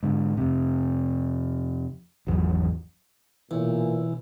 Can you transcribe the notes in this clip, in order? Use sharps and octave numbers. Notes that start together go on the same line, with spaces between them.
G#2 D3
F2 C3
G#1 E2 C#3 F#3
B1 A#2 E3